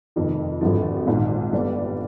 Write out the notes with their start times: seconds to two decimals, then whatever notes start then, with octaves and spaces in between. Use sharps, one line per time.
0.16 F1 F2 D#3
0.61 G#1 G2 D3 F3
1.07 A#1 G#2 D#3
1.52 G1 G2 D3 G3 D4